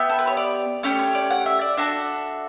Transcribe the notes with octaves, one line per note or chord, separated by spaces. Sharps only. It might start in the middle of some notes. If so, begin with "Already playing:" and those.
Already playing: B3 G4 E5
A4
B4
C#5
D5
A3 C#4 G4 C#5
C#5
D5
F#5
E5
D5
D4 F#4 A4 E5